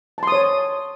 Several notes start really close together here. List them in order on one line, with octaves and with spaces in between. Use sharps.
A5 C6 D#6 C#5